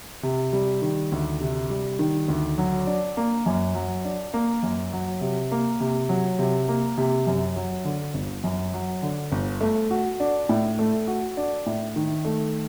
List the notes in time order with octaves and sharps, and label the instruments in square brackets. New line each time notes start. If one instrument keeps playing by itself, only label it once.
[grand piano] C3
G3
D#3
D2
C3
G3
D#3
D2
F#3
D4
A#3
F#2
F#3
D4
A#3
F#2
F#3
C3
A#3
C3
F#3
C3
A#3
C3
F#2
F#3
D3
G1
F#2
F#3
D3
G1
A3
F#4
D4
A2
A3
F#4
D4
A2
D#3
A3